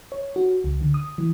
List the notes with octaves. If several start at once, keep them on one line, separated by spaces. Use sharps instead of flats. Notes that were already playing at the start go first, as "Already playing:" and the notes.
C#5
F#4
C#2
D3
D#6
E3